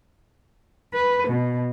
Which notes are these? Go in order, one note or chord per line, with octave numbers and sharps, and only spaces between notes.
B4
B2